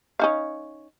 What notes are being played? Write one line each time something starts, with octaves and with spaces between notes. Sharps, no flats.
C#4 D#4 F5